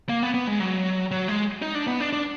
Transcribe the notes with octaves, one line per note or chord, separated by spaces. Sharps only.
A#3
B3
B3
G#3
F#3
F#3
G#3
D#4
D4
B3
D4
D4